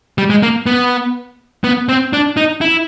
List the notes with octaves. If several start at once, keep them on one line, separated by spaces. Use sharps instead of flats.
G3
G#3
A#3
B3
B3
C4
D4
D#4
E4